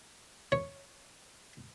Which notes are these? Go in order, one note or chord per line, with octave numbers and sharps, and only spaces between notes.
C#5